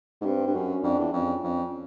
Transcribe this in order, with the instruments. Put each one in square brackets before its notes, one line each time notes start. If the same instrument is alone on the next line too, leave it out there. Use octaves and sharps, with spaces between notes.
[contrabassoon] G#2
[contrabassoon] G2 [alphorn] C4
[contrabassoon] G2
[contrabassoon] F#2 [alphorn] C#4
[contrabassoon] F2 [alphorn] D4
[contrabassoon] E2
[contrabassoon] F2 [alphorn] C#4
[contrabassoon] F2